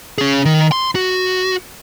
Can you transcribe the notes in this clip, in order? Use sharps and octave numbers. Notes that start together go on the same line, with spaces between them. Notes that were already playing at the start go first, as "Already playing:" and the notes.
C#4 G#4
D#3
C6
F#4